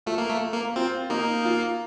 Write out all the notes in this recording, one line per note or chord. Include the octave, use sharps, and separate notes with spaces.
A3 F4
A#3
A3
A#3
C4 F4
A#3 D#4
F4